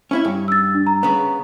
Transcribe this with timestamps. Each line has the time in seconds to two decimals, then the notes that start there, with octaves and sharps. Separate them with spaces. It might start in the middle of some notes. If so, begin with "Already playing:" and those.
0.11 C#4 E4 E5
0.25 G2
0.48 E6 A6
0.75 D4
0.87 A#5
1.03 C#3 B3